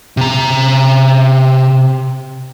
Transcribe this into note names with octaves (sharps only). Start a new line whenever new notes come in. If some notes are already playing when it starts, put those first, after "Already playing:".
C3 A#5